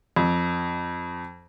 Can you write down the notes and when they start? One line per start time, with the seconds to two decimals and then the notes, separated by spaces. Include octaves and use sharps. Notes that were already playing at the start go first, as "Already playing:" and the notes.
0.16 F2